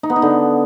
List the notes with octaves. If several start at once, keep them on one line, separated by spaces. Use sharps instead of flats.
D#4
B3
D#4
D3